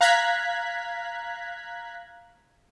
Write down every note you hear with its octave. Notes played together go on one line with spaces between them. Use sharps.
F5 A#5 F#6 G#6 B6